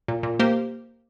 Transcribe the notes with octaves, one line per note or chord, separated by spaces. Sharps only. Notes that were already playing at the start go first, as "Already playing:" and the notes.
A#2
A#2
A#3 G4 C5